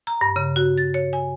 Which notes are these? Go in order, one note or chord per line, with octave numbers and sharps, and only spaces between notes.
A#5
G2
C#3
F#4
A6
C#5
G#5